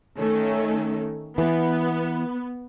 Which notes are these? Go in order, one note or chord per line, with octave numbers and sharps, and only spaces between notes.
D#3 A3 C#4
E3 B3